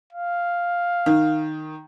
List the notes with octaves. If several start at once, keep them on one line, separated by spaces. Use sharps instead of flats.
F5
D#3